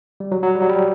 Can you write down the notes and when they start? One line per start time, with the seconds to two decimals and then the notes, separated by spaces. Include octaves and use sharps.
0.20 G3
0.32 F#3
0.43 F#3
0.55 G3
0.62 F#3
0.70 G3